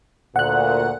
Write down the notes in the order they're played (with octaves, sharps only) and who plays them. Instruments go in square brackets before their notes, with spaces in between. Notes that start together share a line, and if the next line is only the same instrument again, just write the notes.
[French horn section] D2 A#2 [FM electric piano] F#5 F#6